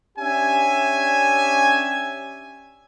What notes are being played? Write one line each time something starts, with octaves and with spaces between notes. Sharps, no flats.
C#4 D4 G4 E5 G#5